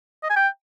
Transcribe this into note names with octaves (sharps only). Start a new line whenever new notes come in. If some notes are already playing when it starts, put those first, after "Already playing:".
D#5
G#5
G5